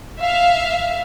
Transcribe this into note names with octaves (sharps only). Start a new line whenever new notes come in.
E5 F5